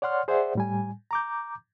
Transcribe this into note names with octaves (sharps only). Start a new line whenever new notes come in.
C#5 D5 F#5 C6 F6
G#4 C5 D5 E5 F#5
A2 G3 G#5
A#5 D6 G6